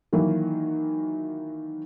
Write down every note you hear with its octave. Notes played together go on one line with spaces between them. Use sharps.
D#3 E3 F#3 A#3